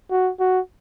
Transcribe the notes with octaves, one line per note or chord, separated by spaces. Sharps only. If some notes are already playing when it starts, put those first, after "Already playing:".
F#4
F#4